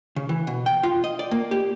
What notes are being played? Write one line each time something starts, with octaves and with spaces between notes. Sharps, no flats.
C#3
E3
B2
G5
F4
D#5
D5
A#3
G4